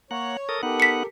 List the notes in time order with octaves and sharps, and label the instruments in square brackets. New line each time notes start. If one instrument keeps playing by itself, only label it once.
[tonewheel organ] A#3 F#5 [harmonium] C#5
[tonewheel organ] A4 A#4 D#6
[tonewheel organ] B3 D#4 F#5 [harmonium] G4 A4 A#4
[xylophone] B6 C#7